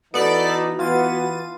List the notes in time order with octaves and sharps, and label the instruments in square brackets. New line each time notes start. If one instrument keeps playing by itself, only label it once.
[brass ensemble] E3 D#4 [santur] B3 [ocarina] F#4 [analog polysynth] A4 D5 B6
[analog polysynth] E3 A6 D#7 [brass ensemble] B3 [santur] F4